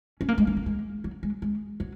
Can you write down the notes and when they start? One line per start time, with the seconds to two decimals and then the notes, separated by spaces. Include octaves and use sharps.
0.21 C#4
0.28 A#3
0.38 G#3
0.47 C#4
0.57 A#3
0.66 G#3
1.04 F#3
1.23 G#3
1.42 G#3
1.80 F#3